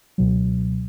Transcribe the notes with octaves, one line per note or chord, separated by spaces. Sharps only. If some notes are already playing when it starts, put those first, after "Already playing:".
C#2 B2 F#3